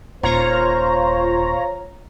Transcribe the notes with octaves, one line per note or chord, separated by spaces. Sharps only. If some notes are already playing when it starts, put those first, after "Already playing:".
D#1 F4 C5 C#5 A#5